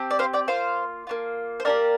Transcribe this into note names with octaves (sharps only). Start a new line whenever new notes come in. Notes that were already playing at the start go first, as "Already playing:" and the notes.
Already playing: C4 G4
D5
C5 F5
D5 G5
A#3 F4 C5 F5
A#3 D4 F4
C5
A#3 D4 G4 A#4 D5